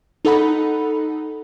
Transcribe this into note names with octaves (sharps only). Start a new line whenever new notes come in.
D#4 A4 F#5 B5